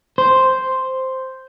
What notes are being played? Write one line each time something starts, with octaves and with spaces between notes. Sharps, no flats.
C5